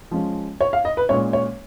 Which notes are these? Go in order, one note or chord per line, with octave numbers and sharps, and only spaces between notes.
F3 G#3 C#4
C#5
F5
D#5
B4
A#2 G#3 C#4 C#5
C#5